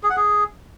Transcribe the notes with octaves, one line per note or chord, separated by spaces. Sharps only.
G#4
F#5
G#4